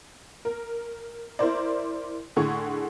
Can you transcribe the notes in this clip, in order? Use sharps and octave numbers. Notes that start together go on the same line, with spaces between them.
A#4
E4 A#4 C5 D5
A2 D3 G#4 C#6